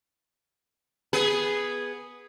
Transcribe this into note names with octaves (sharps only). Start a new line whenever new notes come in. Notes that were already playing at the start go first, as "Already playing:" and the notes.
B3 G#4 B4